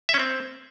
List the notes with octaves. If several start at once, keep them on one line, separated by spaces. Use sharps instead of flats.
E5
C#4
C4